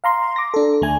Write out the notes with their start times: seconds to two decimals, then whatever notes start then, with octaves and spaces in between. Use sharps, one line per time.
0.04 F5 A#5 C6
0.36 D6 A#6
0.54 D4 A4
0.81 D2 A3 G#5